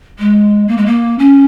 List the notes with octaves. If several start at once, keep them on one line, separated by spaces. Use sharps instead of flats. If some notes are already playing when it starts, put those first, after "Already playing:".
G#3
A#3
G#3
A#3
C#4